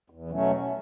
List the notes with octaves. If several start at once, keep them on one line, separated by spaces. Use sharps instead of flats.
E2
B2 F#3 A3 C#4